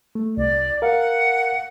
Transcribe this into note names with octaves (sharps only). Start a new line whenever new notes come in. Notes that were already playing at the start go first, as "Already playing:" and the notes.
A3
C2 D5
A#4 F5 F#5